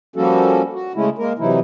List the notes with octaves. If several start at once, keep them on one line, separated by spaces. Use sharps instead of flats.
F3 G3 A#3 C#4 F#4 A4
F#4
C#3 G#3 A3 C#4 E4
G#3 A#3 A#4
C3 E3 F#3 D#4 E4